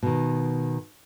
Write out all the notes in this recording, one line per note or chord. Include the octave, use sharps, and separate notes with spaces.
B2 D#3